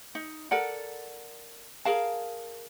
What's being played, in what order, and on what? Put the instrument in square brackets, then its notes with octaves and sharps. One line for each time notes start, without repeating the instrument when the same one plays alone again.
[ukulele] D#4
A4 A#4 D5 F#5
G#4 A#4 F5 A5